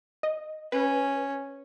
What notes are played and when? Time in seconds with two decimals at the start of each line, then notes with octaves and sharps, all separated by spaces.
0.23 D#5
0.72 C#4 B4